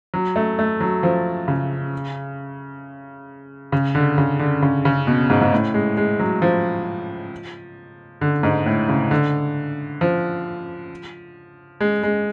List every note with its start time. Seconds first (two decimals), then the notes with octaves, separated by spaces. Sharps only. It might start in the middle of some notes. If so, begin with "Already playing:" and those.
0.14 F#3
0.36 A3
0.59 A3
0.81 F#3
1.03 F3
1.48 C#3
3.72 C#3
3.95 D3
4.18 C#3
4.39 D3
4.62 C#3
4.85 C#3
5.07 B2
5.30 G#2
5.41 G#2
5.53 A2
5.74 G#3
5.97 G#3
6.19 F#3
6.42 F3
8.21 D3
8.43 G#2
8.66 A2
8.89 C#3
9.11 D3
10.01 F3
11.81 G#3
12.03 G#3